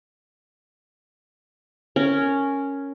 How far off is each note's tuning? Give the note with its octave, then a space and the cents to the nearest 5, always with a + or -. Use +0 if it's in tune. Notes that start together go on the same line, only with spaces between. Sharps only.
C#4 +0 A#4 -10